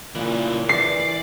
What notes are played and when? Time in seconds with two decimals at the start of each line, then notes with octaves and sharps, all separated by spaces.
0.15 A#2 C#3 E3
0.69 E3 D5 C7